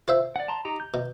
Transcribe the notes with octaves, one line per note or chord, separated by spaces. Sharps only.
F4 C5 E5
D5 F#5
A5 A#5 C6
D#4 G4 A#5
G6
B2